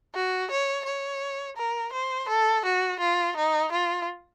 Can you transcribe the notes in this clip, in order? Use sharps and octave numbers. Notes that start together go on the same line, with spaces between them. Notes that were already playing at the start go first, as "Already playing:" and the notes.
F#4
C#5
C#5
A#4
C5
A4
F#4
F4
D#4
F4